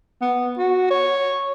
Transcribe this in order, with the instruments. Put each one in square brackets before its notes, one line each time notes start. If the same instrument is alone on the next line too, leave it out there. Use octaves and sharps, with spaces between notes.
[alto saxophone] B3
F#4
C#5